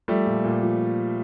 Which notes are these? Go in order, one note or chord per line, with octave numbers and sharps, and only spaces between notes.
F3 G3 A3
A#2
A#2
F3